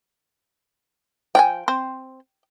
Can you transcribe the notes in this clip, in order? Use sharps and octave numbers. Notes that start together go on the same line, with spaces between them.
F3 D5 G5 G#5
C4 C5